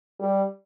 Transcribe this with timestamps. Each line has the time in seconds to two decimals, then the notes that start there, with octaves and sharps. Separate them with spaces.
0.20 G3